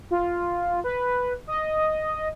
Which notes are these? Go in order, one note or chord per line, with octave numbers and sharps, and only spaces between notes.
F4
B4
D#5